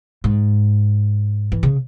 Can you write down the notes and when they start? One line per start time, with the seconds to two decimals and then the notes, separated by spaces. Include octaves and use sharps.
0.24 G#2
1.52 E3
1.63 C#3